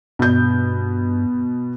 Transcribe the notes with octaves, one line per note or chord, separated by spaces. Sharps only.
G2 B2 G6